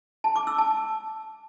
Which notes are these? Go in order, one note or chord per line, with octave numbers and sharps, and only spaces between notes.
A5
D6
E6
A5